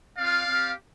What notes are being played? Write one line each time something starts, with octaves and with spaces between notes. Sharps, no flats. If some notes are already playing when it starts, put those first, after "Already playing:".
C4 F4 D5 F5
C4 G4